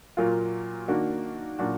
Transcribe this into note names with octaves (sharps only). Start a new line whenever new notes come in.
A#2 F#3 A#3 F4
D#3 A#3 D4 F#4
A#2 F#3 D4 F#4